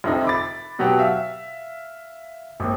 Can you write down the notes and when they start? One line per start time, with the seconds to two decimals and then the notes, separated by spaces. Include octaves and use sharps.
0.04 F2 C3 D#4
0.25 B5 D6 A6
0.79 B2 F#3 F#4 G4
0.99 E5 F5
2.60 G#1 D#2